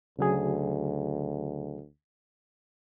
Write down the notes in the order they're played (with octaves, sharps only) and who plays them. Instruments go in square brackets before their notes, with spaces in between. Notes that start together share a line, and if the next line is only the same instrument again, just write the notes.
[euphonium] D2 [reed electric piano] C#3 F#3 G#4